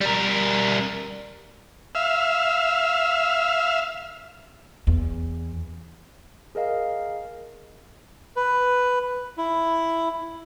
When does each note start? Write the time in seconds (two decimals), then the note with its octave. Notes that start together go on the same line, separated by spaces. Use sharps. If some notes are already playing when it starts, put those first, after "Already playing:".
0.01 G3 A#4
1.95 E5 F5
4.87 E2
6.55 G#4 A#4 D#5 F5
8.36 B4
9.38 E4